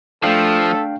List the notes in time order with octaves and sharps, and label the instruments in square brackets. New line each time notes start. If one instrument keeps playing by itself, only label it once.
[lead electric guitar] F3 [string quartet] A3 [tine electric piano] D4 F5 G5 [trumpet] A4